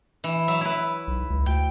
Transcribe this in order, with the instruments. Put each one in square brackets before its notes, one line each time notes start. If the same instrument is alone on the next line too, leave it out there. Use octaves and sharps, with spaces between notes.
[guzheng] E3
F#3 E5
E4 B4
[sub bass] B1
C#2
[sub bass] D2 [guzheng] G5